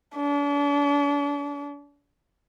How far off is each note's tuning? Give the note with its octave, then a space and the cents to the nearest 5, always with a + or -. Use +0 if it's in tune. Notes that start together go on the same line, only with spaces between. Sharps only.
D4 -40